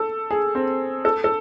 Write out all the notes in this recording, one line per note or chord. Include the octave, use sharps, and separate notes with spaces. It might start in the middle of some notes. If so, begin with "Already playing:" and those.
Already playing: A4
G#4
C4
A4
A4